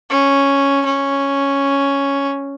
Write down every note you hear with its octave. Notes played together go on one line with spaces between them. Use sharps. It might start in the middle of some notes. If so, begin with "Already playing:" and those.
C#4
C#4